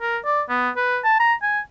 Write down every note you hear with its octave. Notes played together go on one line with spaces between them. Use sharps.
A#4
D5
B3
B4
A5
A#5
G#5